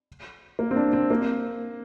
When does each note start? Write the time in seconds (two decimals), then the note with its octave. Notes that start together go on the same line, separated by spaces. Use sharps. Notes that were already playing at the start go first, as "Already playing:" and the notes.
0.59 A#3
0.71 C4
0.76 D4
0.93 C4
1.11 A#3